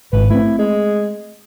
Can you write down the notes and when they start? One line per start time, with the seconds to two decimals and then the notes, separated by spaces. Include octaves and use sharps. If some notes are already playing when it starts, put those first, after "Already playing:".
0.13 G#1 B4
0.30 A3 C4 E4
0.59 G#3